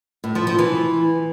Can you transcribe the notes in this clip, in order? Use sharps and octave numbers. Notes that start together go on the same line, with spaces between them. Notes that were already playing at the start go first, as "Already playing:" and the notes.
A2
F3
F3
E3